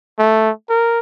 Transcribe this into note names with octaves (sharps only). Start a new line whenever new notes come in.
A3
A#4